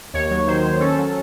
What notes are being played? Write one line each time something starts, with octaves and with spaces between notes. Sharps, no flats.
D#2 C#5
F#3
D#3 C5
D#3
C#4 A4
F#3